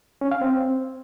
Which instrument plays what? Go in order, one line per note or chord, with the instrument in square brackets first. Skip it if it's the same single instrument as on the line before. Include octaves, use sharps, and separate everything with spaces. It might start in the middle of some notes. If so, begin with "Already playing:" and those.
[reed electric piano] C#4
F5
C4